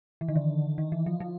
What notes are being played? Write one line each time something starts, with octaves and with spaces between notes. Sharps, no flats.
E3
D#3
D3
D#3
E3
F3
F3